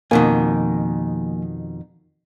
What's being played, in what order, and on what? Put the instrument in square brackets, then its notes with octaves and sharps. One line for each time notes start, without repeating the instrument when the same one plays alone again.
[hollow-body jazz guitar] F2 B2 D#3 [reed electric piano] F3 A#3 G#5